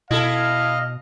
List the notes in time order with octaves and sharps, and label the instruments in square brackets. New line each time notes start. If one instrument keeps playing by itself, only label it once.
[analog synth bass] B2 [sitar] E4 A4 [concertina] D#5 [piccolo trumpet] F5